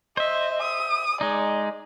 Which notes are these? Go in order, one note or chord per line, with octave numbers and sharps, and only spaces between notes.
C5 D#5 E5
D#6
G#3 D#4 D5